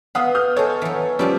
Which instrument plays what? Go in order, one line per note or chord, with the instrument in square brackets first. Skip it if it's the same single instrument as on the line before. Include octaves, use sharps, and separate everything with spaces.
[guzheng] B3 B5 [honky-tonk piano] F5 F#5 D#6
[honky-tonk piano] D#6 F6 G6
[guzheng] G#3 G#4 [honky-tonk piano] A4 C#5
[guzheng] E3 F#3
[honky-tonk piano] F3 G3 C#4 [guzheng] F4 D5 E5